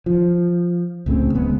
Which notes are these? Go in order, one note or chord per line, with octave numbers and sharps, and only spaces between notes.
F3
C#2 A2 C#3 C4
D1 C#3 G#3 B3